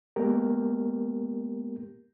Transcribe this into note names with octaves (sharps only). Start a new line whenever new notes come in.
G#3 A#3 B3 G4 A#4